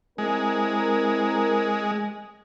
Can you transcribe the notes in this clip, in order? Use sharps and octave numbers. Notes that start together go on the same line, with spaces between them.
G#3 C4 E4 A#4